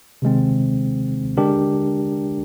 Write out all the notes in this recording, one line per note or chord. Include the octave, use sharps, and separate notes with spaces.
C3 D#3 G#3 C4
D3 G#3 D4 G4 A#4